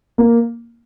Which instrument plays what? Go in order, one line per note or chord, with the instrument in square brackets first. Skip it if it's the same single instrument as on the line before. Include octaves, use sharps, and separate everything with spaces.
[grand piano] A#3